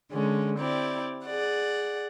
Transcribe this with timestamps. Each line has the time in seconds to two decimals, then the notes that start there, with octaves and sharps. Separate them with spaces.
0.11 D3 G#3 C#4
0.58 C4 E4 G4 D5
1.25 G#4 D5 F#5